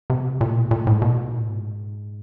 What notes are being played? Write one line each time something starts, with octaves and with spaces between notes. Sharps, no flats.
C3
A#2
B2
A#2
A2
B2
A#2
A2
G#2